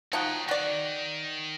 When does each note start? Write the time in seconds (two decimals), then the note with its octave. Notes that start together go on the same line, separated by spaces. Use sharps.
0.13 F3 D#4 F#4 C#5 G5
0.48 D#3 F#4 D5